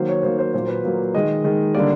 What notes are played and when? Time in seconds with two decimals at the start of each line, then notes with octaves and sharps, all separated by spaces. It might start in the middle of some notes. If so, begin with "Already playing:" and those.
Already playing: D#3 F#3 A#3 C5
0.09 C#5
0.23 D#3 F#3 A#3 C5
0.39 C5
0.53 A#2 F#3 A#3 C5
0.68 B4
0.84 A#2 F#3 A#3
1.14 D#3 G#3 D#5
1.44 D#3 G#3
1.75 D3 G3 A#3 D5